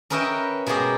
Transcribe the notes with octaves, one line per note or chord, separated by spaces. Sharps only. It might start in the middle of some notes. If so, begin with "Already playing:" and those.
C#4 A#4 B4 D#5 E5 G5
B2 G#3 A#3 G4 G#4